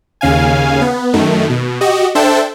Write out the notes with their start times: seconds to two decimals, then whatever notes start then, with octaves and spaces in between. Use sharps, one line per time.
0.21 D#2 C#3 F5 G#5
0.81 B3
1.14 F#2 D#3 A3
1.50 B2
1.81 F#4 G4 D#5
2.15 D4 A4 C5 E5 G5 A5